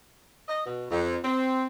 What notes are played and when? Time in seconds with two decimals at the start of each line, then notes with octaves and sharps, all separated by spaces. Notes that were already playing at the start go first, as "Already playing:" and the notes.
0.49 D#5
0.66 B2
0.90 F2
1.23 C4